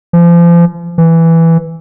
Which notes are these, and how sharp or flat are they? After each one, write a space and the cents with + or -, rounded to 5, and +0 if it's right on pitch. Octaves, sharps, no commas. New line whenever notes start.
F3 -35
E3 +0